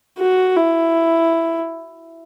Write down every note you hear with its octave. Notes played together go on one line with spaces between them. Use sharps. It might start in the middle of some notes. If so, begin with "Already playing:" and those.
F#4
E4